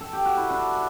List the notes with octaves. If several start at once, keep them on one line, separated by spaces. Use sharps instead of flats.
A4
G4
F#4
E4
D4